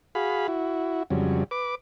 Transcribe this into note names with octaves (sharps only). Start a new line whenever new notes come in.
F#4 G#4 F5 B5
E4 F#4
F2 C#3 F#3 G3
B4 D6